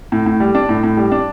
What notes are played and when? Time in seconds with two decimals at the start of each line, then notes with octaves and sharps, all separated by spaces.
0.12 A2
0.26 A2
0.40 G3
0.55 D4
0.69 A2
0.83 A2
0.97 G3
1.12 D4